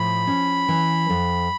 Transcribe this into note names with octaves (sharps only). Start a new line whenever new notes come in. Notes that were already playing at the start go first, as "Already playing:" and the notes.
Already playing: A2 F3 B5
C#4
E3
F2